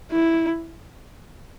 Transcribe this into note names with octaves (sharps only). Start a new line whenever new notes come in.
E4